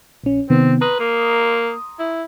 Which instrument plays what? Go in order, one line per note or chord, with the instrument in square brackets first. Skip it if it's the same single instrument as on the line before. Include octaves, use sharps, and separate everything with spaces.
[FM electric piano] A#1 C#4
[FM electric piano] C3 D#3 B3 [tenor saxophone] C4
[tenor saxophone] B4 [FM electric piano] A#5 C6 D#6
[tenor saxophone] A#3
E4